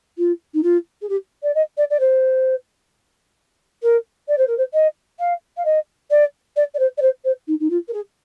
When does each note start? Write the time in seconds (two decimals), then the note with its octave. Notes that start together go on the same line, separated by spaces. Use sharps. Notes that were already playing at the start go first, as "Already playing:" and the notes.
0.18 F4
0.54 D#4
0.63 F4
1.01 G#4
1.09 G4
1.43 D5
1.55 D#5
1.77 D5
1.90 D5
2.00 C5
3.82 A#4
4.28 D5
4.38 C5
4.47 A#4
4.57 C5
4.73 D#5
5.19 F5
5.57 F5
5.65 D#5
6.10 D5
6.56 D5
6.74 D5
6.79 C5
6.97 D5
7.02 C5
7.24 C5
7.47 D#4
7.60 D#4
7.70 F4
7.88 A#4
7.93 G#4